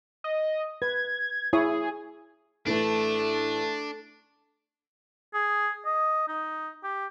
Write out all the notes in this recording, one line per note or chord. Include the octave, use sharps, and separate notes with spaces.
D#5
B4 G#6
E4 G#4 C#5 D#6
A1 A2 A3 D4 B4
G#4
D#5
D#4
G4